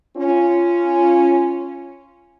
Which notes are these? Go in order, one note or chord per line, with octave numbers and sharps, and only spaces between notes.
C#4 F4